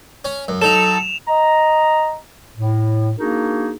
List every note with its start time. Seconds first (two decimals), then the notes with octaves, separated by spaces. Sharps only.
0.25 C#4
0.48 F#2
0.61 F#3 D#4 A4 E7 F7
1.28 D#5 A#5
2.56 A2
3.17 A#3 D4 D#4 F#4 G#4 A#4